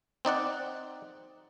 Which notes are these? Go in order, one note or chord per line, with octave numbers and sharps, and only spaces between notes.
C4 D#4 D5 F#5